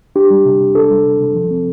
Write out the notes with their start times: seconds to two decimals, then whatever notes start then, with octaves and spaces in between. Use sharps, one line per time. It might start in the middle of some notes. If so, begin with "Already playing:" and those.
0.16 D4 G4
0.30 G3
0.45 C3
0.61 C3
0.75 D4 A4
0.90 G3
1.06 C3
1.21 C3
1.35 F3
1.51 C4